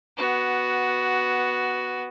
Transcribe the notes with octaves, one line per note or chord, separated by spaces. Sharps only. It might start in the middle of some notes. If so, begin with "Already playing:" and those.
B3 F#4